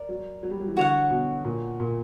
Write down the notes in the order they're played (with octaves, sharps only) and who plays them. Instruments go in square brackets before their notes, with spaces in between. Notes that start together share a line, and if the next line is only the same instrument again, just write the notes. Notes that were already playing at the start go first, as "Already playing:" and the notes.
Already playing: [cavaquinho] A#4 D5
[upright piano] F#3
F#3
G3
F#3
E3
[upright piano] D3 [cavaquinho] F#4 C#5 F#5
[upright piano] B2
A#2
A#2